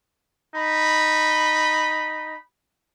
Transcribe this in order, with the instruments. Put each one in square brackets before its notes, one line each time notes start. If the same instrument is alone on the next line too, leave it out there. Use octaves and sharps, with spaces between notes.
[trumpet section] D#4 B5